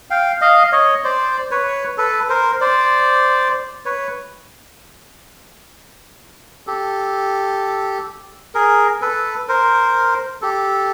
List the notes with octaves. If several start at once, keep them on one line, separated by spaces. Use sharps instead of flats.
F5 G5
D#5 F5
C#5 D#5
C5 D5
B4 C#5
A4 B4
A#4 C5
C5 D5
B4 C#5
G4 A4
G#4 A#4
A4 B4
A#4 C5
G4 A4